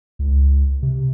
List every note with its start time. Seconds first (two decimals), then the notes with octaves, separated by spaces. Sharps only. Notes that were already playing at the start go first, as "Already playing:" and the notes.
0.19 C#2
0.82 C3